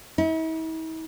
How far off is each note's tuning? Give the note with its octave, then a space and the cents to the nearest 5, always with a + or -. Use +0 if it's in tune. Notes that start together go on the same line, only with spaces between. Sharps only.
E4 -45